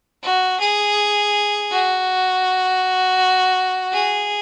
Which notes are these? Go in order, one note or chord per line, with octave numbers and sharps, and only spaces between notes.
F#4
G#4
F#4
G#4